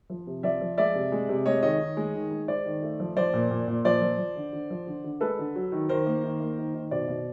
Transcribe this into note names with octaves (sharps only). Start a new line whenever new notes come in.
F3
C3
F3 D5 E5
F3
G#3 D5 E5
C3
G#3
C3
G#3 C#5 D#5
D#3 C#5 D#5
D#3
G#3
D#3
G#3
G#3 C5 D5
D#3
A3
F3
F3 C5 D5
A#2
A#2
A#2
F3 C5 D5
F3
F3
D3
D3
F3
D3
D3
G#3 A4 B4
D3
F#3
D#3
D#3 A#4 C5
A#3
D#3
A#3
D#3
D#3
B2 C5 D5
B2